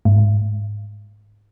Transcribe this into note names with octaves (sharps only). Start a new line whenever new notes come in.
G#2